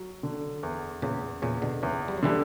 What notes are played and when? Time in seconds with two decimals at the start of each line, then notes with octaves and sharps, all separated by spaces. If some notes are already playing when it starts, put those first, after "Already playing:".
Already playing: F#3
0.23 D3
0.63 E2
1.02 E2 A#2 C#3
1.42 E2 A#2 C#3
1.62 B2 D3
1.82 E2 C#3 E3
2.08 G3
2.17 F#3
2.22 D3 E3 G3